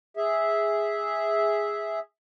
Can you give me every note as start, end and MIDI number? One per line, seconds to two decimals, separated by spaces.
0.17 1.99 68
0.17 1.99 76